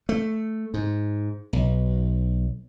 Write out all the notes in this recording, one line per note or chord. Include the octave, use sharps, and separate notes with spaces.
A3
G#2
B1